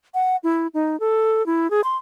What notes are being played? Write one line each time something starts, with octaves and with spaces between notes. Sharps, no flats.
F#5
E4
D#4
A4
E4
G#4
C6